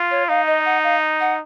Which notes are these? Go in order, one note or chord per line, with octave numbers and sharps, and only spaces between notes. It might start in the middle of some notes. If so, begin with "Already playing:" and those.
Already playing: F4
C#5
D#4 F5
D#5
F#5
F5
F#5